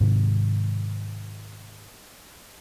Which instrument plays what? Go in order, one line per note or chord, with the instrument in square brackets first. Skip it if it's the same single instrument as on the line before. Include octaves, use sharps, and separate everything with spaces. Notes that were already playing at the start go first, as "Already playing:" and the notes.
[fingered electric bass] G#2 C3 D#3